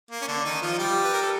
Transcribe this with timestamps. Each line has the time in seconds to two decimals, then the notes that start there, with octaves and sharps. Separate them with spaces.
0.11 A#3
0.22 C#4
0.28 D3 D4
0.45 D#3 D#4
0.62 F3 F4
0.79 G3 G4
1.04 B4
1.13 A#4
1.22 A4